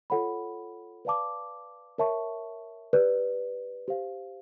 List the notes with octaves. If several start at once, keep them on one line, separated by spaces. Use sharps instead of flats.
F4 A4 C#5 F#5 B5
B4 D5 F5 A5 D6
A#4 C#5 E5 A5 C#6
G4 B4 D5
G4 C5 F5